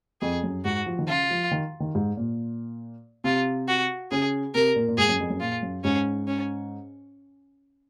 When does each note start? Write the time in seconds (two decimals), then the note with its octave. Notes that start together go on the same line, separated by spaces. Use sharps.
0.21 F2 G#4
0.43 F#2
0.65 G#2 F#4
0.86 F3
0.99 D#3
1.08 C#3 F4
1.31 F3
1.51 D#3
1.80 D#3
1.95 G#2
2.17 A#2
3.24 C3 F4
3.68 F#4
4.11 C#3 G#4
4.55 C3 A#4
4.76 A#2
4.88 A#2
4.98 G#2 G#4
5.09 F#2
5.20 F2
5.30 F#2
5.41 A#2 F4
5.63 F#2
5.84 G#2 C#4
6.27 C#4